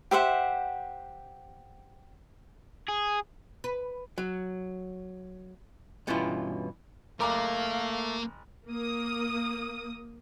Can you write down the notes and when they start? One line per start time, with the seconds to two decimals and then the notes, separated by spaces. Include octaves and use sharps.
0.11 G4 C5 E5 F#5
2.89 G#4
3.64 B4
4.18 F#3
6.07 G2 B2 E3 C#4 E4 F4
7.21 F#1 A3 A#3 A#4 F5 A#5 D6
8.68 A#3 D#6